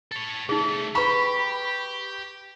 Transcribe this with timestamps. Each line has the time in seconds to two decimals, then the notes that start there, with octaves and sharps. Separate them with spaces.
0.12 A4 C#5
0.49 C2 A3 D#4 G#4
0.95 G4 B4 A#5 B5 C#6